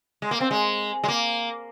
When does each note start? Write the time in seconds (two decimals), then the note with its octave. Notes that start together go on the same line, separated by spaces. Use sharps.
0.22 G#3
0.31 A#3
0.40 C4
0.51 G#3
1.04 G#3
1.08 A#3